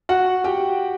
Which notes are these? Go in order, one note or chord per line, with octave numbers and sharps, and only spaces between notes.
F#4 F#5
G4 G5